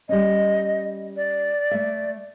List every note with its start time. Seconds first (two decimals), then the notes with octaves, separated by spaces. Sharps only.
0.09 G3 C#4 D#5
1.16 D5
1.71 A3 E5